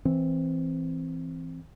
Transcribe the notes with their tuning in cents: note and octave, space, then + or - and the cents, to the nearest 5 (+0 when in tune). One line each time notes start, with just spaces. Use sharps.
E3 +0 C4 +0